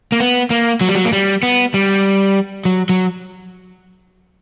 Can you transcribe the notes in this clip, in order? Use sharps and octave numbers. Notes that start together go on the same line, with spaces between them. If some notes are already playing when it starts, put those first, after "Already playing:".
A#3
B3
A#3
F#3
G3
F#3
A#3
G3
B3
G3
F#3
F#3